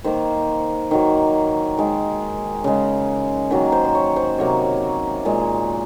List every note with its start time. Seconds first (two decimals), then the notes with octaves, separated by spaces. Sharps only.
0.04 D#3 A#3 C5
0.91 D#3 F#3 A#3
1.77 D#3 G#3
2.64 C#3 G#3
3.51 D#3 F#3 A#3
3.72 C5
3.85 C5
3.95 C#5
4.16 C5
4.38 C3 F#3 A#3 C#5
5.25 A#2 G#3